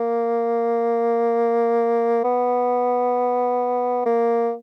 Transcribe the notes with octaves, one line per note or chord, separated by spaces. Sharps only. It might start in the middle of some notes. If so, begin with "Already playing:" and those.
Already playing: A#3
B3
A#3